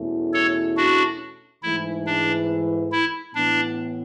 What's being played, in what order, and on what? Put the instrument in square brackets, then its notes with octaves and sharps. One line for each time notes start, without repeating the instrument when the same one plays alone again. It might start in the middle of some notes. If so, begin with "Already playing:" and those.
Already playing: [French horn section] E2 B2 A3 C#4 E4
[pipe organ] A4 C#5
D4 F#4
[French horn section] G#2 E3 A3 [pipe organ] E4
[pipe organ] D4
E4
[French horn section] A2 E3 B3 [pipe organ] D4